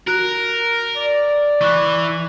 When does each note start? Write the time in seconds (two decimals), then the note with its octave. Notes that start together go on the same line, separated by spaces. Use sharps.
0.07 F#4 A#4 F#6 F7
0.96 D5
1.61 E3 C#6 F#6